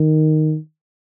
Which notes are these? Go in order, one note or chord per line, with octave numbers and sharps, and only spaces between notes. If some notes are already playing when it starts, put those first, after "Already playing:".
Already playing: D#3